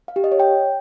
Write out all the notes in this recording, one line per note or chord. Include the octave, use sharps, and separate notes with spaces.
F5
G4
D#5
C#5
G5